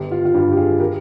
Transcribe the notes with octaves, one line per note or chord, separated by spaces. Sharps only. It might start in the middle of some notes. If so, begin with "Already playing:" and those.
Already playing: G1 G4
F4
F4
G2 G4
G4
F4 G#4
G4 A#4